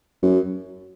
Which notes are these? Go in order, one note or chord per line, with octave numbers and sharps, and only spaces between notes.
F#2